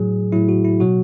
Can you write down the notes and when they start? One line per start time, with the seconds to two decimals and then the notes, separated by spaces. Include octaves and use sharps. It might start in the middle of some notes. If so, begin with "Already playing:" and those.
Already playing: A2 F#3 G#4
0.32 A2 F#3 E4
0.49 F#4
0.65 E4
0.80 B2 F#3 F#4